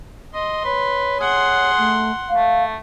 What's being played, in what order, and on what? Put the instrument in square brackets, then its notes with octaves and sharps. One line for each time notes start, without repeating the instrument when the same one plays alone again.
[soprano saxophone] D#5 [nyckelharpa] C6
[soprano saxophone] B4 [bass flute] C#5
[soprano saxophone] G#4 [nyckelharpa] F#5 C6
[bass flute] A3
[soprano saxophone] A3 [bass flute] F5